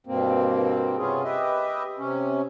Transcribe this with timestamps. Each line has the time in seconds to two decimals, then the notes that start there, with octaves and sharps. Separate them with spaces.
0.07 G2 B2 A#3 C4
0.97 C3 B3 C#4 F4 G#4
1.24 G4 B4 D#5 E5
1.98 C3 C#4